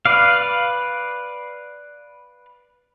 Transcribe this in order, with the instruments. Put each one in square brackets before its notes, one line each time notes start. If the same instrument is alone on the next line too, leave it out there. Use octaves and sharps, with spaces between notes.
[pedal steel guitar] B4 D5 F5